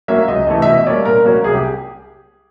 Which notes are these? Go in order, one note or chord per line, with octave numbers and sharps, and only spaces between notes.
F#3 A#3 C#4 E5
C#2 D#5
C3 E3 A3 D#5
E5
B2 D#5
G3 A#3 C#4 D5
A#2 A#4
F#3 A#3 C#4
C2 G#4
G4